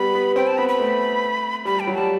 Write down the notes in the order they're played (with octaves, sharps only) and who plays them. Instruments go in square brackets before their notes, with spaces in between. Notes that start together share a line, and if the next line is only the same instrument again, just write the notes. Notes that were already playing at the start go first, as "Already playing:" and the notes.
Already playing: [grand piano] G3 B3 [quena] B5
[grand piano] B3
[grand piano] C4 [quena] G5
[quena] A5
[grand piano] B3 [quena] B5
[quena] B5
[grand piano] A3
[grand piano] G3 [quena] B5
[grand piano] G3 [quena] G5
[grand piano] F#3
[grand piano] G3 [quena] A5